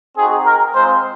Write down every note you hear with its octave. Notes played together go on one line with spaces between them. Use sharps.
C4 D#4 F#4 G#4
A#4
G#3 C4 F4 C5